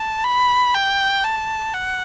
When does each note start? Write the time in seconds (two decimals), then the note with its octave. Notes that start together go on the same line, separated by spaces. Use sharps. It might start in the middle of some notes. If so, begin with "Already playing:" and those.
Already playing: A5
0.24 B5
0.74 G5
1.24 A5
1.74 F#5